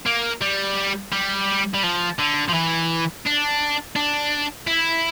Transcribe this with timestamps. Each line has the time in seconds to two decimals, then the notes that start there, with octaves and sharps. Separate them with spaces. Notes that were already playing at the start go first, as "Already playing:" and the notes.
0.06 A#3
0.41 G3
1.13 G3
1.74 G3
1.83 F3
2.19 D3
2.49 F3
2.54 E3
3.26 D4
3.96 D4
4.67 E4